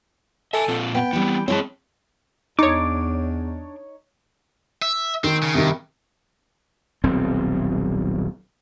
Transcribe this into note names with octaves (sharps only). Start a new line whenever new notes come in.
A4 E5 G#5
A#2 C4 F4
B3 G5
E3 G3 B3 C4
G#3 C4 E4 C#5 G5 A5
E2 D4 D#4 C#5 D6
E5
D#3 C4
C#3
G2 C3 D#3
D#1 B1 C4